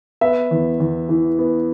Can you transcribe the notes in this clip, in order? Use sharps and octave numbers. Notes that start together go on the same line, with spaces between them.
B3 E5
E2
E2
E3
B3